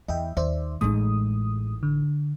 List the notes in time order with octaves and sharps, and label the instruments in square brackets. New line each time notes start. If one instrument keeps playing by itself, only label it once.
[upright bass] E2 [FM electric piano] D#5 E5 G5
[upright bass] D#2 [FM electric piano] C5 D5 E5
[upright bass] A1 D#4 [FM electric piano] A2 G#3 D#6
[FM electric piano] D3